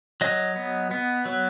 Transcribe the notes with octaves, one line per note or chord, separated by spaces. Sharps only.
F#3 D#5
B3
B3
F#3